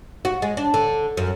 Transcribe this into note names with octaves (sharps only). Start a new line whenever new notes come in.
F#4
G#3
D4
D3
F#2